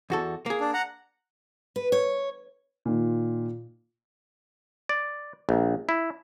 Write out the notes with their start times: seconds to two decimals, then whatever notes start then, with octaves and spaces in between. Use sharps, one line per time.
0.10 E2 F#4 A4
0.46 A#3 G#4
0.61 D4
0.74 F#5 A#5
1.76 B4
1.92 C#5
2.85 A#2 D#3 F4
4.89 D5
5.49 A#1
5.89 E4